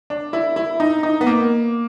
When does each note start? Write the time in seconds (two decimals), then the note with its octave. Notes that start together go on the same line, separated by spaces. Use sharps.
0.10 D4
0.33 E4
0.56 E4
0.80 D#4
1.03 D#4
1.21 B3
1.27 A#3